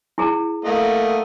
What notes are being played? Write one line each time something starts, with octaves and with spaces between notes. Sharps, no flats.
E4 G#4 A#5
A3 A#3 D#5 F#5